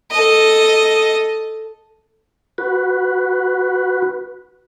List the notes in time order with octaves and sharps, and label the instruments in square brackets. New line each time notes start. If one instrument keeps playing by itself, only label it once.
[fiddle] A4 D#5
[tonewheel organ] F#4 B4